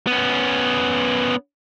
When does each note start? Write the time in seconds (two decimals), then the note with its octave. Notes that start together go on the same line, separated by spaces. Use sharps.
0.07 B3 C#4